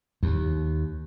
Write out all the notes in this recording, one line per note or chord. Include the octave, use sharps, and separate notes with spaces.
D#2